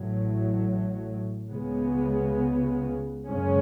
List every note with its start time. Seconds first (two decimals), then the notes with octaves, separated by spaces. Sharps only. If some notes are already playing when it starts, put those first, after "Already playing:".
Already playing: A1 A2 F#3
1.50 C#2 C#3 G#3 B3
3.26 F#1 F#2 C#3 G#3 C#4